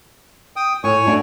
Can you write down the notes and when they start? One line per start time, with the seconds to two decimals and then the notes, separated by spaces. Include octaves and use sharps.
0.56 G5 D#6
0.84 A2 C#5 G#5 C#6
1.07 A3 D4 F#4